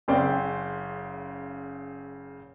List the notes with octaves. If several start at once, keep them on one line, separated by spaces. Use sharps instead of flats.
F#1 C#3 C4 D5 G5